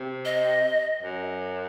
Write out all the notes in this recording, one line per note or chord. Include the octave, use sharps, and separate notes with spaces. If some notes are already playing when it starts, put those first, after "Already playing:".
Already playing: C3
D#5
F#2